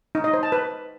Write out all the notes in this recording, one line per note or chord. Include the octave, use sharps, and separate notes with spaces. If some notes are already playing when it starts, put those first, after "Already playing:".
D#4
D#5
C5
A5
B4